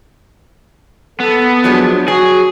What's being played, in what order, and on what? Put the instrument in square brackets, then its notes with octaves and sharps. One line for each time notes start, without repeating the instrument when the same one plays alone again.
[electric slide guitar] B3 [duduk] A4
[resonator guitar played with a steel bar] F3 F#3 G#3 [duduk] D4
[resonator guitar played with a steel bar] F#3 [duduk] F#4 [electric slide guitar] G#4